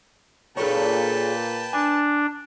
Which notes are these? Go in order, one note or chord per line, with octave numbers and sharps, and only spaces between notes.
A#2 G#4 A4 B4 C#5 G5 A5
D4 G#5